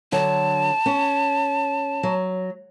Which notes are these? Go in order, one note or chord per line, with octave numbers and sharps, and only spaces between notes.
D3 F#3 A5
C#4
F#3